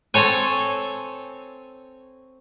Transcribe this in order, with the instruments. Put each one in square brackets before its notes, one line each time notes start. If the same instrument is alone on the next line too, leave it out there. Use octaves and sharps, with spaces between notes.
[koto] C4 A4 C#5 G#5